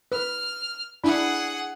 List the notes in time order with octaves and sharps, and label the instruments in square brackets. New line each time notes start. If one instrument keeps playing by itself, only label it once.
[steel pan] B4 [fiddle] F6
[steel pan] D4 E4 B5 [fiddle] G#4 F#5